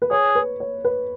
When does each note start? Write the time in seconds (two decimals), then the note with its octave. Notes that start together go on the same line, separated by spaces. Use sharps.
0.02 B4
0.11 G#4 C#5
0.35 B4
0.60 C#5
0.85 B4